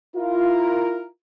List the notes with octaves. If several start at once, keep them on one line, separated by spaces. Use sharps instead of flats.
E4 F4 A#4